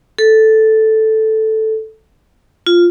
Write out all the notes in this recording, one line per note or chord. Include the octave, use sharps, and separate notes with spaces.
A4
F4